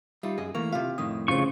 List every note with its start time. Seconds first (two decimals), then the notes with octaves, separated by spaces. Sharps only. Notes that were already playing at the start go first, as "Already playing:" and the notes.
0.23 G3 D#4 F4 E5
0.38 F#2 G#4 D#5
0.55 E3 A3 A#3 C#6
0.72 C3 E4 F4 F5
0.98 F2 A2 D#3 D#6
1.28 C#3 C#4 F4 C5 C#6